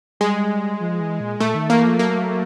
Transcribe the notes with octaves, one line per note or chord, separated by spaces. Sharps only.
G3 G#3
F3
E3
A#2
A#2 A3
D#3
E3 A#3
F3
F#3 A#3